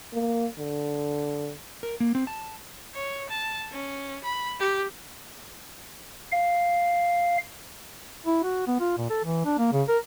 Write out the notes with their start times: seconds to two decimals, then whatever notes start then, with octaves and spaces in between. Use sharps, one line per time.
0.13 A#3
0.59 D3
1.83 A#4
2.00 A#3
2.15 C4
2.27 A5
2.94 C#5
3.29 A5
3.72 C#4
4.24 B5
4.60 G4
6.32 F5
8.26 E4
8.44 F#4
8.67 B3
8.80 F4
8.97 A#2
9.10 A4
9.24 E3
9.45 D4
9.59 A#3
9.72 C#3
9.88 A#4